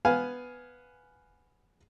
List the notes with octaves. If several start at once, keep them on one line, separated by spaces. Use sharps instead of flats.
B3 F5 G#5